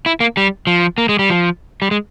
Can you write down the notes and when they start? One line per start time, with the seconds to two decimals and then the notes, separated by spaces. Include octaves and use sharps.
0.06 E4
0.20 A#3
0.37 G3
0.67 F3
0.98 A#3
1.09 G#3
1.19 G3
1.30 F3
1.82 G3
1.91 G#3